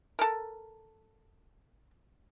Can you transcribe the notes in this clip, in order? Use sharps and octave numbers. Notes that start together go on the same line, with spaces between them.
A4 A#4